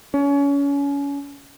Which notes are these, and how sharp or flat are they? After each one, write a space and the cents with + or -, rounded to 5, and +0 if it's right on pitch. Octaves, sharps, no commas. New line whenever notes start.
C#4 +30